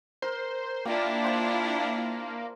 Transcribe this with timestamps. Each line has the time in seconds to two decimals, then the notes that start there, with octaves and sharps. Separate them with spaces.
0.22 A#4 C5
0.85 A#3 D4 E4 F4 G4 D5 F5
1.24 C5 G5 A#5